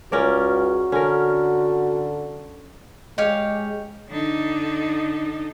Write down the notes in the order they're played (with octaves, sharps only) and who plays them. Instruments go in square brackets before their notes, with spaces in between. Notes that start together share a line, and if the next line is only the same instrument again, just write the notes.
[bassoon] C#2 [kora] C#4 A#4 D5 [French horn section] F#4
[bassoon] D3 [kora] C#4 A#4
[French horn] G#3 [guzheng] G4 C#5 F5 [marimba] D#5
[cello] D3 D#4